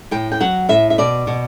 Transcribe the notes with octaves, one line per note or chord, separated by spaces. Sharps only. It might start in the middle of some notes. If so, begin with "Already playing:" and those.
A2 G5
G5
F#3 F#5
A2 E5
E5
B2 D5
B2